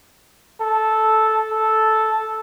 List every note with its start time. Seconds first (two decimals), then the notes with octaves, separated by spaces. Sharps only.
0.61 A4
1.51 A4